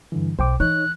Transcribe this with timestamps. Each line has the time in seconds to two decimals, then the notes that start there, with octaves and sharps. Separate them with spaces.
0.12 G2 D3 E3
0.39 B1 C5 G5 D6
0.60 E3 D#4 C#5 F#6